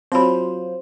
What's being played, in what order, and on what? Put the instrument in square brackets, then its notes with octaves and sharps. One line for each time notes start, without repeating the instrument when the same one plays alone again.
[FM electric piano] F#3 F4 C5 [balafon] C4 B5